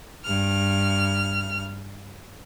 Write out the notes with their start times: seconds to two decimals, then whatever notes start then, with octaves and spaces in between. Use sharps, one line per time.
0.24 G2 F6